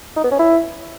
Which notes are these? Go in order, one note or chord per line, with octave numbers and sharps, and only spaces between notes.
D#4
B3
C#4
E4